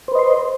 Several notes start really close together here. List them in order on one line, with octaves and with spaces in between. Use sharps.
C5 B4 D#5 C6